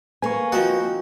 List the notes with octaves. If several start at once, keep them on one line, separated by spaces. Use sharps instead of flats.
A#3 B4 G#5 C#6
F3 C4 D#4 F#4